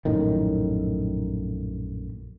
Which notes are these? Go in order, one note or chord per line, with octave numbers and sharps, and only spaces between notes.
A#1 F#2 A2 D#3